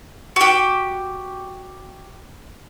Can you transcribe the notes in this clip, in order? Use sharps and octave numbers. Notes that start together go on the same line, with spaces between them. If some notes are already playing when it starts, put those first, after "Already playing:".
F#4 G4